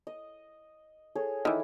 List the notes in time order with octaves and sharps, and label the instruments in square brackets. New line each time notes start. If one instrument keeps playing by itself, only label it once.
[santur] D#5
G#4 A4 C#5
[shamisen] D#3 E3 [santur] E4